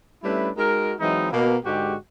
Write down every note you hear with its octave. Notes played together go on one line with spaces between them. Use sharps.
G3 A3 C#4 D4 E4 B4
G#3 D#4 F#4 A#4
E3 F#3 G#3 C4 D#4 E4
B2 A#3
G#2 D3 G#3 F#4 G4